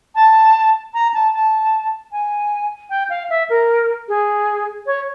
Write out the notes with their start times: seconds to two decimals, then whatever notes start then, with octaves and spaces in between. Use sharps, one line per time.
0.15 A5
0.94 A#5
1.14 A5
1.34 A5
2.12 G#5
2.90 G5
3.10 F5
3.30 E5
3.50 A#4
4.08 G#4
4.87 C#5